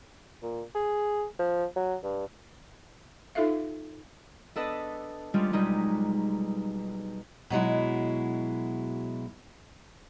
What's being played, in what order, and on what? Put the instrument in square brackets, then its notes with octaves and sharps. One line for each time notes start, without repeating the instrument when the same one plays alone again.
[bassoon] A#2
G#4
F3
F#3
G2
[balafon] D#4 F4 A4 E5 F5
[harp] B3 D4 A4 B4 D#5 A5
G3 G#3 C#4 D4 F4
B1 G3 G#3 D#4 B4
[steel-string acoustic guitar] B2 F#3 G#3 E4